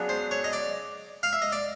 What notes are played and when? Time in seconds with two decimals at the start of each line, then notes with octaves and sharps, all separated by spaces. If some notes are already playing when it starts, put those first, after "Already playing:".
Already playing: C#3 F#3 B3 D4
0.09 C5
0.31 C#5
0.44 D#5
0.53 D5
1.23 F5
1.33 E5
1.42 D#5
1.52 D5